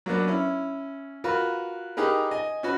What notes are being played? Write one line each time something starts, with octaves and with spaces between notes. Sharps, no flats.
F#3 A#3 B3 D4
C#4 E4
F4 F#4 A#4 B4
D#4 G4 G#4 A#4 B4
D#5 G#5
C#4 F#4 B4